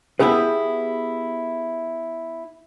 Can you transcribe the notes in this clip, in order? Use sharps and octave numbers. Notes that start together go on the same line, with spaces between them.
B3 E4 G4 G#4 B4